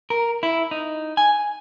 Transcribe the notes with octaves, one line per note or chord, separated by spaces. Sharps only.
A#4
E4
D#4
G#5